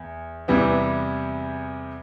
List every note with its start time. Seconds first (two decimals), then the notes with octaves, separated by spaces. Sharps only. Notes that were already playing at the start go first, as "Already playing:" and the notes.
Already playing: E2
0.48 E2 C3 E3 G3 B3